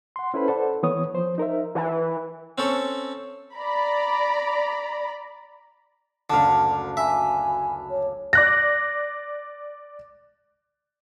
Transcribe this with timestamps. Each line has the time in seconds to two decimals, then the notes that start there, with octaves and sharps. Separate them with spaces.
0.16 F#5 C6
0.34 C#4 E4 A4 B4 C5 B5
0.48 A4 C5 D5 F#5
0.83 E3 B3 C#5 D#6
1.14 F3 C5
1.38 D#4 A#4 C5 E5
1.75 E3
2.58 C4 C#4 A4 C#5
3.54 D5 A#5 B5
6.30 F#1 D2 D3 D4 F5 E7
6.97 E5 G#5 B5
7.89 C#5
8.33 D5 F#6 A#6